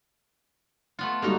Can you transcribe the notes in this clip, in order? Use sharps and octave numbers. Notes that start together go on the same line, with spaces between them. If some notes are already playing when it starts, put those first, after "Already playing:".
A3 B3 F4
G3 A#3 D#4 F#4 A4 A#4